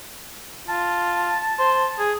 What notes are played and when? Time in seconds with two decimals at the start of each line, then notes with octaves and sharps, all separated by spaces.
0.68 F4 A5
1.59 C5
1.99 G#4